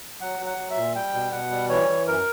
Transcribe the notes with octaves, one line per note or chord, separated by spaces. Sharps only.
F#3 F#5
F#3
F#5
F#3
E5
A#2
G3 G5
B2
B2 F#5
G3
E3 C#5
E3
F#2 A#4